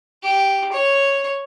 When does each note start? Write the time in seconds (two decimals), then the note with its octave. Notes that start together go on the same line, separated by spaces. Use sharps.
0.22 G4
0.72 C#5